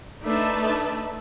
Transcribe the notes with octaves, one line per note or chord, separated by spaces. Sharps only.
A3 D4 D#4 B4 E5 A5